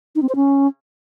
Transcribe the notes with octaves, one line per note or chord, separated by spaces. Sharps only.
D#4
C4
C5
C#4